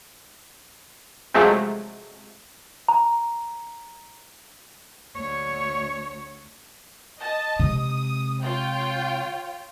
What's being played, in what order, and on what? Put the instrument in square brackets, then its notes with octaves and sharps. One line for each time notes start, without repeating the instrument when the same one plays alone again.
[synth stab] C3 F3 F#3 G#3 A3 C4
[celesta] A#5
[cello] D2 C#5
[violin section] D#5 A5
[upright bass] C3 G#3 [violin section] D#6
[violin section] F4 C#5 G5